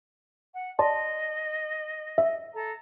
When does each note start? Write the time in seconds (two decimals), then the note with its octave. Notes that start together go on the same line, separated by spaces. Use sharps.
0.53 F#5
0.79 D5 D#5 A5 C6
2.18 E5
2.54 A4 A#5